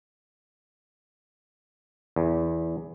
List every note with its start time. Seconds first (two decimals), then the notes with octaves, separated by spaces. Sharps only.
2.16 E2